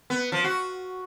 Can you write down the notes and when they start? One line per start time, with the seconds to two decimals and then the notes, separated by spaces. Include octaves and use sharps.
0.10 B3
0.32 F3
0.44 F#4